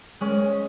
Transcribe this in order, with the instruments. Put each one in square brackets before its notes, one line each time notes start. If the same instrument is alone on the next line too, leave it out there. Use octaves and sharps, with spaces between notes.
[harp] G#3 [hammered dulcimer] C#4